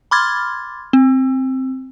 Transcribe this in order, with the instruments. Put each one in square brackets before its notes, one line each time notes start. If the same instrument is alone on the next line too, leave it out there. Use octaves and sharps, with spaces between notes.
[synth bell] B5 C6 D6 F6 G#6 A6
C4